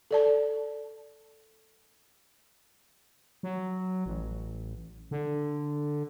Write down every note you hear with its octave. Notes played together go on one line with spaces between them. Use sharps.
A4 D5 A5
F#3
A1
D3